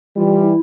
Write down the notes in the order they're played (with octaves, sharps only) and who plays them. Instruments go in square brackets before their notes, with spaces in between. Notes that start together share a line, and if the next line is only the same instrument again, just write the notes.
[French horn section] E3 G3 [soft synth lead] F4
[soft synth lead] E4